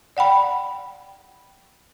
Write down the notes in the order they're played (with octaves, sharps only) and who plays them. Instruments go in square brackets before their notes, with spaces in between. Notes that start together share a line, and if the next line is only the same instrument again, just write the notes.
[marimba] D5 F#5 G5 B5